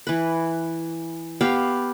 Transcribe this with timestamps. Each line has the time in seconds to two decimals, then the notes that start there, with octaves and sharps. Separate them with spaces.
0.07 E3 B4
1.41 B3 G4 F5